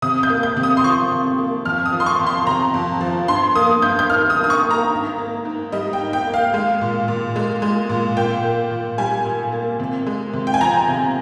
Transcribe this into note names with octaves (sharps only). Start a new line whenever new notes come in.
C3 D#6
G6
A#3
G6
C3
D#6
C6
F3 C#6
C3
A#3
F2 F6
D#6
F3
C6
C#6
F2
C6
C3 A#5
F2
F3
G2 C6
A#3 D#6
G2 G6
G6
D#3 F6
D#6
G2
D#6
C#6
A#3
A#5
G#2
A#3
G#2
G3 D#5
G5
G#2
G5
A#3
F5
G#3
A#2
A#2
G#3
G#3
A#2
A#2 G5
A#3
A#2
G3 G#5
A#2
A#3
C3
G#3
C3
G5
G#5
F3 A#5
C3